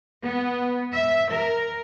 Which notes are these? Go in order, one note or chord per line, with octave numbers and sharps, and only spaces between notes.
B3
E5
A#4